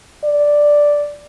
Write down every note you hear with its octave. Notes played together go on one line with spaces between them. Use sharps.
D5